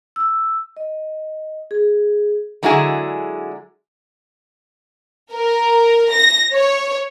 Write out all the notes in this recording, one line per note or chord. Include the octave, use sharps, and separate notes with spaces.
E6
D#5
G#4
D3 F#3 G#3 E4 F#4 G#4
A#4
A#6
C#5